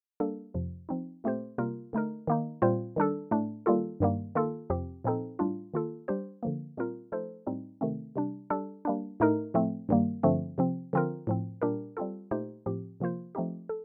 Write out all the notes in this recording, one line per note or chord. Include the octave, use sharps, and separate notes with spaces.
G3 A#3 D4 A4
F2 C3 F3
F3 C4 D#4
A#2 A3 C4 G4 C5
C3 G3 A#3 F4 A#4
D3 A3 D#4 A#4
D#3 A#3 D#4
A#2 G3 C4 F4 C5
D#3 G3 D4 A4
A2 A3 D4
D#3 G3 A#3 F4 A4
G2 D#3 G3 A#3
D#3 A#3 F4 A4
F2 C3 F3 C4 G4
A#2 F3 C4 D#4 A4
A2 G3 D4 F4
D#3 A#3 F4 A4
G3 D4 G4 C5
D3 F3 A#3
A#2 G3 C4 F4 A#4
F3 A3 D#4 A4 C5
A2 G3 C4 D#4
C3 D#3 A3 C4
C3 G3 D4
G3 D4 A4
G3 A#3 D4
A2 A3 D#4 A#4
A2 F3 A3 C4
G2 D#3 G3 A#3
G2 D3 F3 A3 C4
C3 F3 C4
D3 F3 C4 F4 A#4
A2 F3 C4
A#2 G3 D4 G4 A#4
G3 C4 F4 A4
A#2 A3 D#4 G4 C5
A2 F3 C4 G4
C3 F3 A#3 F4 C5
F3 A3 C4 D#4 G4
A4